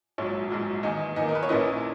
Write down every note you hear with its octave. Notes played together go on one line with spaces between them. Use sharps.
A#1 G#2 F#3 C#5
A#1 G#2 F#3
E2 D#3 A#3 D#5
E2 D#3 A#3 D#5
A#4
B4
C#5
A#1 A#2 A#3 C#4 E4 D#5